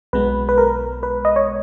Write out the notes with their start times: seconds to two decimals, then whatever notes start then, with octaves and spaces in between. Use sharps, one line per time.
0.13 B1 B2 G#3 B3 B4
0.49 B4
0.58 A#4
1.03 B4
1.25 D#5
1.36 C#5